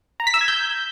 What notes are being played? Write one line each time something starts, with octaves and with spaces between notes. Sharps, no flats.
A#5
B6
E6
G#6
G6